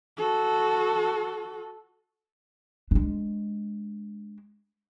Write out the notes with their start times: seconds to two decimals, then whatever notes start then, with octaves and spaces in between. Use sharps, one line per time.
0.17 F#4 A4
2.91 G#3 D4